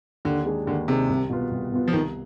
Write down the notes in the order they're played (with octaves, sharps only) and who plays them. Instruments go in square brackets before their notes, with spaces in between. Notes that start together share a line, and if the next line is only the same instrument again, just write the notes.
[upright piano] D#2 [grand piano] D3
[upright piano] D#3 G#3 D4 G#4
[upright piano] D#2 [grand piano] D3
[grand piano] C3 [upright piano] D#3 G#3 D4 G#4
[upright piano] C2
B2 B3 F4 B4
C2
B2 B3 F4 B4
[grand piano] F3
[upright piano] C2 [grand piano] D#3